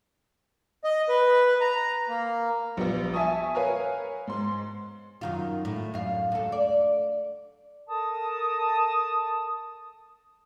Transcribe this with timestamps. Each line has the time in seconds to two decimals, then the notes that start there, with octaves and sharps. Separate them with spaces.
0.84 D#5
1.09 B4
1.61 A#5
2.09 A#3
2.77 A#1 G3 B3
3.14 E5 G#5 A5 C#6 D#6
3.55 A#4 B4 C#5 F5 G#5
4.27 G#2 C6
5.21 F#2 D#3 F4
5.65 A2
5.94 F#2 F5
6.32 D2 A4
6.52 D5
7.87 A4 A#4 A5 D#6